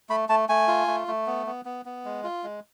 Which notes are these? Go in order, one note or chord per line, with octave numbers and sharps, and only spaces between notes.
A3 B5
A3 A5
A3 G#5
F4
A3
A3
B3
B3
B3
B3
G#3
F4
G#3